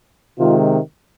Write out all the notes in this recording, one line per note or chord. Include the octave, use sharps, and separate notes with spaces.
C3 D#3 G#3 F4